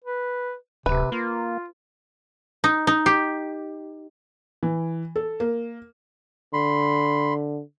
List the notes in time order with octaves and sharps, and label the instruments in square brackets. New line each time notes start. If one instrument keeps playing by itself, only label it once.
[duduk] B4
[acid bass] D1 [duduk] C3 [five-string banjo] B4
[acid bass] A#3 [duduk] F4
[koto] D#4
D#4
G4
[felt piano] E3
A4
A#3
[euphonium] D3 [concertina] B5 C6